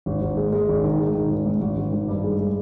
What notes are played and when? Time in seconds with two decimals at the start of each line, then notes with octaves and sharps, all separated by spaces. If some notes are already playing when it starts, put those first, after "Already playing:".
0.06 G#1
0.22 G#1
0.37 G#3
0.52 G#3
0.69 G#1
0.84 D#3
0.99 G#3
1.15 D#3
1.30 G#1
1.46 G#2
1.62 G#1
1.77 G#1
1.93 D#3
2.08 G2
2.24 G#3
2.39 G#3